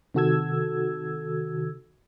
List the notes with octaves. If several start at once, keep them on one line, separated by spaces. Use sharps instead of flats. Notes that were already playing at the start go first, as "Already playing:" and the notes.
C3 D#3 F#4 A4 E6 G#6